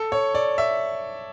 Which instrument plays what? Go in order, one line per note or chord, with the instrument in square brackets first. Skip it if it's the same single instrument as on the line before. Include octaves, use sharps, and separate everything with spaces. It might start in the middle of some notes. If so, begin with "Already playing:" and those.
Already playing: [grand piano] A4
C#5
D5
E5